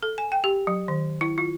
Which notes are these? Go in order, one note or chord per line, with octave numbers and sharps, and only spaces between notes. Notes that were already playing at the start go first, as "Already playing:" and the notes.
A4
G#5
G5
G4
F#3
D#3
E4
F4